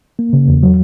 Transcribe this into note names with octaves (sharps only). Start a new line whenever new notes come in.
A#3
C#3
E2
F#3